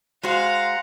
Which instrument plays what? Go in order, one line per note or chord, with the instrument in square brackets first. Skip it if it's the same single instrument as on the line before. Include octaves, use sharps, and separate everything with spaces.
[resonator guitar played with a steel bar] G#3 F#4 C5 [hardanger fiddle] F5 [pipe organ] F#5 A#5